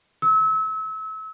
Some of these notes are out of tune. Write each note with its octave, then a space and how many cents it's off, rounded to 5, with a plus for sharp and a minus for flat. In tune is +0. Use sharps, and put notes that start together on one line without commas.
E6 -30